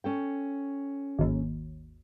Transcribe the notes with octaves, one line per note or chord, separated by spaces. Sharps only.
C#4 A4 G5
G#1 D#2